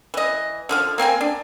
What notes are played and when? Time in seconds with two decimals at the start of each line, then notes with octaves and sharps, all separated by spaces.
0.14 E3 D#5
0.69 D3 F3 F5
0.98 A#3 C4 A#4 G#5
1.21 D4